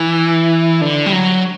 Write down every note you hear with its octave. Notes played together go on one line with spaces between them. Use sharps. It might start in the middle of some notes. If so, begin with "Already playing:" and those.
Already playing: E3
D3
G3
F#3